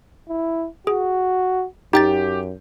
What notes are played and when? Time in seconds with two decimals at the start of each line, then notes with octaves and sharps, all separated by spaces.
0.29 E4
0.87 F#4 G#4
1.93 F#2 D#4 G4 G5 A6